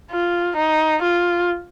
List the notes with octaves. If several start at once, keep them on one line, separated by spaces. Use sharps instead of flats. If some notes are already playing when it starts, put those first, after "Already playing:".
F4
D#4
F4